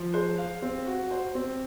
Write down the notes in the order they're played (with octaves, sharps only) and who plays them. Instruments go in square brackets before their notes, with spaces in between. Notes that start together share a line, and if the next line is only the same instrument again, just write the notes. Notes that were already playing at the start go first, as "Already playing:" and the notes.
Already playing: [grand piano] F3
[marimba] G#4 [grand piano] C5
[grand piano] F5
C4
F#4
C5
C4